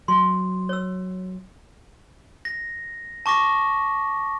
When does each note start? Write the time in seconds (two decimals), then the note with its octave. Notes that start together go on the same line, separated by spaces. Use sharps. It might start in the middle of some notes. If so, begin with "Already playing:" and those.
0.08 F#3 C6
0.69 C#5 E6
2.45 A#6
3.26 A5 C#6 D6 A#6